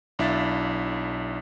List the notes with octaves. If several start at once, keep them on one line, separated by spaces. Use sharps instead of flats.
B1 D4 E4 E5 F5 A6